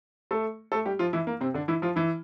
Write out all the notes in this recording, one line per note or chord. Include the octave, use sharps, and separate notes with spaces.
A3 A4
A3 A4
G3 G4
F3 F4
E3 E4
A#3
C3 C4
D3 D4
E3 E4
F3 F4
E3 E4